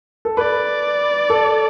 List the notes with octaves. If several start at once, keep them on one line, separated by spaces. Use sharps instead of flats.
A4
B4 D5
A4